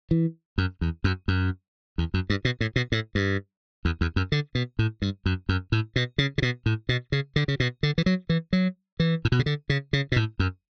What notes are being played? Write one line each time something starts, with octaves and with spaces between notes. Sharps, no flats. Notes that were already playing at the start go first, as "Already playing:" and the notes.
E3
F#2
E2
F#2
F#2
E2
F#2
G2
B2
A2
B2
A2
G2
E2
E2
F#2
D3
B2
A2
G2
F#2
F#2
A2
B2
C#3
C#3
B2
A2
B2
C#3
D3
C#3
B2
D3
E3
F#3
E3
F#3
E3
A2
B2
C#3
D3
C#3
C#3
B2
A2
F#2